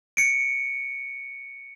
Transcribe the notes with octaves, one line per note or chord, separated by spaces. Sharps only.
C#7 D7